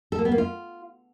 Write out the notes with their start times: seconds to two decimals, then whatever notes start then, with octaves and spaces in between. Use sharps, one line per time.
0.12 A4
0.19 A#3
0.25 B3
0.32 A#3
0.38 F4